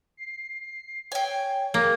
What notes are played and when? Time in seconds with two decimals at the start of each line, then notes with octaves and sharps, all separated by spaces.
0.17 C7
1.12 C#5 G5 G#5
1.74 A#3 G#4